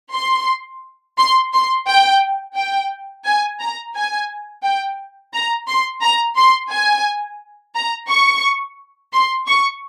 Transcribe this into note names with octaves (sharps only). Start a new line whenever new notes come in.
C6
C6
C6
G5
G5
G#5
A#5
G#5
G5
A#5
C6
A#5
C6
G#5
A#5
C#6
C6
C#6